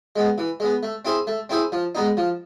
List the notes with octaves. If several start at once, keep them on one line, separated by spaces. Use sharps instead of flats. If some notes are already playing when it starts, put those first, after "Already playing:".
G#3 B3
E3
G#3 B3
A3
C4 E4 G#4 C5
A3
C4 E4 G#4 C5
F3
G#3 B3 D#4
F3